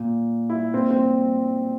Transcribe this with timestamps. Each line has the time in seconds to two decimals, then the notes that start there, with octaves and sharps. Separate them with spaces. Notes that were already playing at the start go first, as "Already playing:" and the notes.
Already playing: A#2
0.50 E4
0.74 A#2 C4
0.91 C4